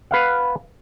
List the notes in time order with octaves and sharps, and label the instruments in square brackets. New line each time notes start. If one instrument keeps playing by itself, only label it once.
[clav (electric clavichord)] B4 F5 F#5